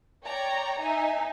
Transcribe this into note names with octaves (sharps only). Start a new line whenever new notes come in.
C#5 D5 G5 A#5
D#4 E5 G#5